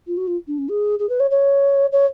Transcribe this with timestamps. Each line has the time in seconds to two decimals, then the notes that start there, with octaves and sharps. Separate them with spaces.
0.07 F4
0.17 F#4
0.27 F4
0.47 D4
0.58 C#4
0.69 G#4
0.99 G#4
1.09 B4
1.20 C#5
1.30 C#5
1.92 C#5